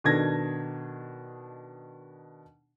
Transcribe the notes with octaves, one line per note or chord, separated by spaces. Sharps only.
B2 D#3 D4 A4 G#6 A#6